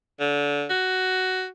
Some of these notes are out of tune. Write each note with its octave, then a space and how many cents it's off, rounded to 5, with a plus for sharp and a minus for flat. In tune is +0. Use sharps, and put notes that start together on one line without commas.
D3 -25
F#4 +10